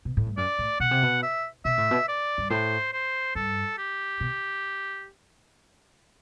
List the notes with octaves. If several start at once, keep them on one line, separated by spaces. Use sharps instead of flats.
B2
A2
G2
F#2 D5
A2
B2 F#5
C3
B2
E5
B2 E5
A2
B2
D5
G2
A2 C5
C5
G2 A4
G4
B2